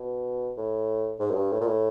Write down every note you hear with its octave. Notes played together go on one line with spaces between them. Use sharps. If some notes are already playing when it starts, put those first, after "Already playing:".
Already playing: B2
A2
G#2
F#2
G2
A2
A#2
A2